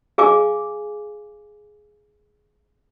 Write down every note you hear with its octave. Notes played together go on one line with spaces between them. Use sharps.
G#4 F5 G#5 D6